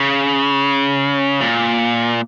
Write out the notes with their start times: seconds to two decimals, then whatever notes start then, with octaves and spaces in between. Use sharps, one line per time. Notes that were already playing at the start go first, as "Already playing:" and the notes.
Already playing: C#3
1.41 A#2